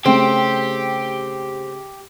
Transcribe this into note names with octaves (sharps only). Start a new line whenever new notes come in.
C#3 A3 C4 G4